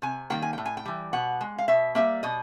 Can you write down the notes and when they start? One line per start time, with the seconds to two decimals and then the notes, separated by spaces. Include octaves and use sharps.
0.02 C3 G#5
0.30 D#3 G3 A#3 G5
0.42 G#5
0.53 A2 G5
0.66 G#5
0.77 G5
0.85 E3 G3
1.13 B2 F#5
1.41 G#3
1.58 F5
1.68 B2 E5
1.95 G3 A#3 E5
2.23 B2 D#5